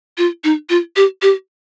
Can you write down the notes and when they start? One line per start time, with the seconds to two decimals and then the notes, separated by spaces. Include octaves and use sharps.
0.18 F4
0.44 D#4
0.70 F4
0.96 G4
1.22 G4